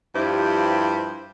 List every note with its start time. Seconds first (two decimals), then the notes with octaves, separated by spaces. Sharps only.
0.15 G2 F3 E4 G4 C5